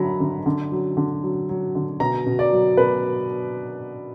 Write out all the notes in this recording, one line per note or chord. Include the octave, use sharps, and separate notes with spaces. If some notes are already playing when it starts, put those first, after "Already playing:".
Already playing: D3 F#3 A#5 B5
D3
D3
F#3
D3
F#3
F#3
D3
B2 A#5
B2
D5
F#3
B2 B4